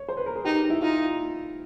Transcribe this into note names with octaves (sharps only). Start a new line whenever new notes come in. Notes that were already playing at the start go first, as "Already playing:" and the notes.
Already playing: C#5
C5
B4
A#4
G#4
D#4 G4
E4
D#4 F4